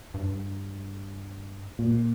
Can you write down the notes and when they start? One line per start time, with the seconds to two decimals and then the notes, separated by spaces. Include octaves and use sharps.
0.14 G2
1.79 A#2